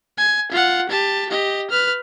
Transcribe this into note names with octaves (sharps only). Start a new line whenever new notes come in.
G#5
F4 F#5
G4 A5
G4 D#5
B4 F6